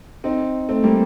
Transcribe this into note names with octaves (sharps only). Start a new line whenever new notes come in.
C4 D#4
A3 C4
G3 A#3